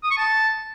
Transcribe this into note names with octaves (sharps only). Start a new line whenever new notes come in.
D#6
C#6
A5